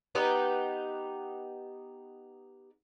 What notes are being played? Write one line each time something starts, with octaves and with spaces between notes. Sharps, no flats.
B3 D#4 G4 B4